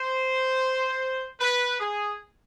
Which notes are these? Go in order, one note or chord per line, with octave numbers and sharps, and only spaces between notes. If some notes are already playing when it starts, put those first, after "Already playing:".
Already playing: C5
B4
G#4